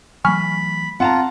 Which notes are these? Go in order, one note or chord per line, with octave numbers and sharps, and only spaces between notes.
E3 F#3 A3 G#5 B5 C#6 F6
C4 F4 F#5 A5 A#5